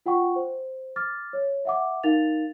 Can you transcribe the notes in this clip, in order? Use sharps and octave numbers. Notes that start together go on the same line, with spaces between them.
F4 F#5 G5 C#6
C5
D6 F6 A6
C#5
E5 F#5 D6
D#4 A#4 F5 A6 F7